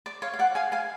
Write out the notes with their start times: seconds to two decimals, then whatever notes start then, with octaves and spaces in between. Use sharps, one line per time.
0.06 D5
0.22 C#5 F5
0.33 F5
0.39 D5 F#5
0.55 F5 G#5
0.72 F5 G#5